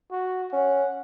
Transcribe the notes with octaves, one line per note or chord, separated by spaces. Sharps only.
F#4
C#4 F#5